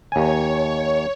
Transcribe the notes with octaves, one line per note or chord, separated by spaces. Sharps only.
D#2 C#5 G#5